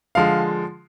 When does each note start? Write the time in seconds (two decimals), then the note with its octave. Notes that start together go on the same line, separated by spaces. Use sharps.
0.15 D3 F3 G#3 F5